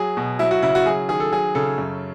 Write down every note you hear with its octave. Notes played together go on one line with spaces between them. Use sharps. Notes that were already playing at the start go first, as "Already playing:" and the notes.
Already playing: F#3 G#4
B2
F#3 E4
F#4
C#3 E4
F#4
F#3 G#4
D#3 G#4
A4
F#3 G#4
C#3 A4
F#2